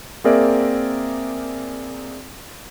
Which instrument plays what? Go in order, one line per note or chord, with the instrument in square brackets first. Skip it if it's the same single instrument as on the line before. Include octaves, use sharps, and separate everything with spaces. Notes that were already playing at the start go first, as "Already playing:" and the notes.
[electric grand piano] A#3 C4 G#4 A#4 D5 E5